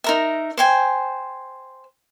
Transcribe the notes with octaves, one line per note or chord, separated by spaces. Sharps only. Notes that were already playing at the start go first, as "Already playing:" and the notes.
D#4 A#4 E5
C5 G5 G#5